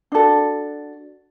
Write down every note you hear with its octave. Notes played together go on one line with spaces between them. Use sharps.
D4 F#4 A4